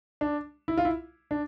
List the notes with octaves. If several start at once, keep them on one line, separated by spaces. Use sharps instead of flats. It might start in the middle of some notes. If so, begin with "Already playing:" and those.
D4
E4
F4
E4
D4